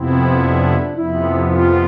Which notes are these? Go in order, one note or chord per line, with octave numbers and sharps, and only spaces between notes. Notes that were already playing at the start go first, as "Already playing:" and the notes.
Already playing: F2 C3 F3 B3 C4 E4
D4
F2 C3 F3 B3 E4
F4